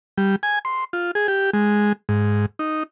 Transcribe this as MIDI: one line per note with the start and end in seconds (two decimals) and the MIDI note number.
0.18 0.36 55
0.43 0.59 80
0.65 0.84 84
0.93 1.11 65
1.15 1.27 68
1.28 1.50 67
1.53 1.93 56
2.09 2.46 44
2.59 2.83 63